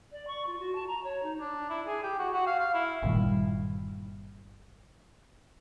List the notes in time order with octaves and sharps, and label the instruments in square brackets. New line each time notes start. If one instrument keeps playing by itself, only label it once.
[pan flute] D5
C#6
F4
F#4
A5
A#5
C#5
D#4
[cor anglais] D4
E4
G#4
G4
F#4
F#4
F5
F5
E4
[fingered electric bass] G1 A#2 D#3 G3